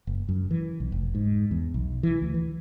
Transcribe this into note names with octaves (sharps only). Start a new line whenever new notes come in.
F#1
F#2
E3
B1
F1
G#2
E2
B1
E3
D2
E3